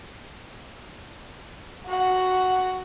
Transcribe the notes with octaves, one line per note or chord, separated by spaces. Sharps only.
F#4 F#5